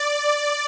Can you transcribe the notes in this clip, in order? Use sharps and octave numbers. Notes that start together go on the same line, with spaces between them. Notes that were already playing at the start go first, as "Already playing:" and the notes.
Already playing: D5